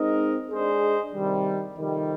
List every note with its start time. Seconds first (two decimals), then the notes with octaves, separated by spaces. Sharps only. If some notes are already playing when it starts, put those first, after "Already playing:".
Already playing: G#3 C4 D#4 A#4 D#5
0.50 G#3 D4 G#4 C5 D#5
1.12 C3 D#3 G3
1.74 F2 C3 D#3 G3